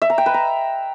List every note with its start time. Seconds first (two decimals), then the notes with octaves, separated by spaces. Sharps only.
0.02 E5
0.10 A#5
0.18 G5
0.26 B4
0.34 A#5